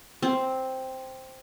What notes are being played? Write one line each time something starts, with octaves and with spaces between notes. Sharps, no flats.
C4